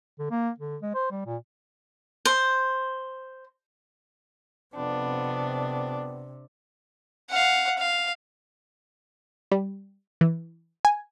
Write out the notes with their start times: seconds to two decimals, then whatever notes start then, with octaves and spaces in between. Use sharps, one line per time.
0.19 D3
0.31 A#3
0.59 D3
0.82 G#3
0.95 C5
1.11 G3
1.26 A#2
2.25 C5
4.75 F2 C3 B3 D4
7.30 F5 F#5
7.78 F5
9.52 G3
10.21 E3
10.85 G#5